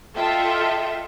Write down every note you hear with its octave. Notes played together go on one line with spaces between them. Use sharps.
F4 A4 D#5 E5 G5